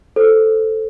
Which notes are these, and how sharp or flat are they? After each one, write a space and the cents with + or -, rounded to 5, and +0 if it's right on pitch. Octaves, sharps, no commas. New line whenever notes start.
A4 +0 C5 +0